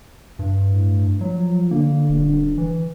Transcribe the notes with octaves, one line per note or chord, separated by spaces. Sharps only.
G2
A2
F3 F#3
D3 A#3
D#1
E3